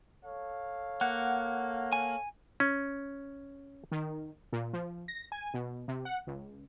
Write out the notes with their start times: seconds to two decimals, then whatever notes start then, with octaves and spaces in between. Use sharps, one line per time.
0.24 A4 C#5 F5
1.01 A#3 F#5
1.93 G#5
2.60 C#4
3.92 D#3
4.53 A#2
4.73 F3
5.08 A#6
5.32 G#5
5.54 B2
5.88 C3
6.05 F#5
6.27 C#2